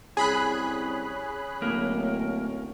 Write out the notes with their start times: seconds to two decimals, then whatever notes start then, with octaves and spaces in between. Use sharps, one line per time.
0.17 C2 C#4 G#4 B5 F#6
1.62 D1 A#3